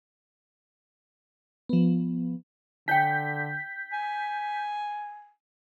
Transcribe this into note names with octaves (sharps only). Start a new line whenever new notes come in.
F3 B3
D3 D4 C#5 G5 G6 B6
G#5